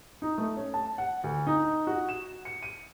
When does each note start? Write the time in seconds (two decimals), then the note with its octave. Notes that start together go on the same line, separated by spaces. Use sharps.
0.22 D#4
0.38 A3
0.57 C#4
0.74 A5
0.98 F#5
1.24 D2
1.47 D#4
1.87 F#4
2.09 E7
2.45 C#7
2.63 D#7